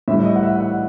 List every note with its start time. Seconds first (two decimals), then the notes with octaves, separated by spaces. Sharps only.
0.08 A2 E5
0.11 G3
0.25 D#5
0.36 F#5
0.43 E5
0.60 F#5